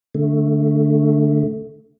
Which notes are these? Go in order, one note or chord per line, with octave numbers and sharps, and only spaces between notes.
D3 A3